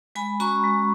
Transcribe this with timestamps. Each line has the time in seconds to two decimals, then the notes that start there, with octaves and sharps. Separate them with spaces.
0.15 G#3 G#5 B5
0.40 C#4 F#4 A#5 C#6
0.64 G#3